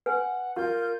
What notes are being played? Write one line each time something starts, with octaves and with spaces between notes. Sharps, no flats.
B4 F#5 G#5
F4 A#4 G6